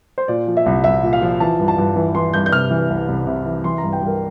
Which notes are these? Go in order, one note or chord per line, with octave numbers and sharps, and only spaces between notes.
C5
A#2 D5
F3
E5
C2
C2 E5
A#2
F5
F3
E3 A5
G2
A5
G2
E3
E3 C6
G2 G6
G6
C3 F6
E3
C2
C2
C3
E3
E3 C6
A#5
G2
G5
G2
A#4